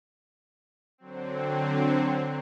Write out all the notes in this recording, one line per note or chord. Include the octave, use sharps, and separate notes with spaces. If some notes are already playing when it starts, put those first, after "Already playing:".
D3 F#3 C4